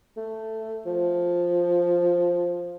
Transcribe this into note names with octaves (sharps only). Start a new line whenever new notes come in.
A3
F3